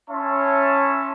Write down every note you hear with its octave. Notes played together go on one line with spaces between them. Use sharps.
C#4 E4 C#5 E5 A5 C6